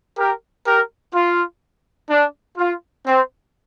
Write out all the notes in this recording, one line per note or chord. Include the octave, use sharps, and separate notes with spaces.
G4 A#4
G4 A#4
F4
D4
F4
C4